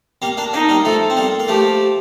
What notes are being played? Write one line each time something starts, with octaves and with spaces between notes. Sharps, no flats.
G3 A#3
A#3 D4
A#3 D4 D#4
G3 A#3
F3 A3 A4
C4
G3 A#3
A#3
F3 A3 G4